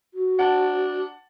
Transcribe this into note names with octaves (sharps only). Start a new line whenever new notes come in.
F#4
D4 F#5 A5